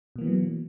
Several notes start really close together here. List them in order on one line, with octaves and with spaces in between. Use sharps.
B2 A#3 E3 B3 F#3